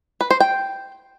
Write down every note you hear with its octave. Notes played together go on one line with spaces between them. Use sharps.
B4
C5
G5